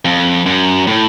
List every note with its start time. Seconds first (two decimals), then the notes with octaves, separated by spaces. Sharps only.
0.05 F2
0.46 F#2
0.87 A2